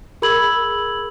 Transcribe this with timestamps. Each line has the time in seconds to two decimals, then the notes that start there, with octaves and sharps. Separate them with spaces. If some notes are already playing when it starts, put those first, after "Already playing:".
0.22 G#4 A#4 B5 E6 G#6 F#7